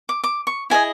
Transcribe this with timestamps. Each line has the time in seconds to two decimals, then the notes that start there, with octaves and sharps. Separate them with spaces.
0.09 D6
0.24 D6
0.47 C#6
0.70 E4 G#4 C5 D#5 G#5